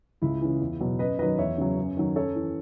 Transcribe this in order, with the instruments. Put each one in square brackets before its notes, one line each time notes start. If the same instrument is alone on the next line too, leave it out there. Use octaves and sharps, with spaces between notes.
[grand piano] C#2 E4
C#3 E3
E2
B2 F#3
F#2 B4 D#5
D#3 F#3 B4 D#5
E2 C#5 E5
C#3 F#3
F#2
D#3 F#3
F#2 A4 C#5
E3